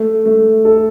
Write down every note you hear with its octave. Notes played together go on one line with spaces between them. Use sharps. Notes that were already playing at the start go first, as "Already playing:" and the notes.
Already playing: A3
A3
A4